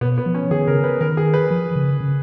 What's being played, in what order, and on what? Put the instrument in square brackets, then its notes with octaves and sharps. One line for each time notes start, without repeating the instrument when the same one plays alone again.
[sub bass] B2 [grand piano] B3
[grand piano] B3
[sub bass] F3
[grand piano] C#4
[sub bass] D#3 [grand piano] G#4
[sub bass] C#3 [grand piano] A#4
[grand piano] B4
[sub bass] D#3 [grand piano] A#4
[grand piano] G#4
B4
[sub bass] F3
C#3
C#3